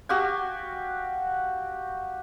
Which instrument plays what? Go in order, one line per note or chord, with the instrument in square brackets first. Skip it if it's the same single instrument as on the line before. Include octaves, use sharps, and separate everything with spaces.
[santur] F#4 G4 F5 G#5